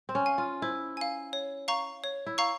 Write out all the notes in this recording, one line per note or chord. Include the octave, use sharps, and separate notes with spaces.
C4
C#4
F5 G#5
F4
E4 C5
F5 G#5
C#5
F5 A#5 C#6
C#5
E4
F5 A#5 C#6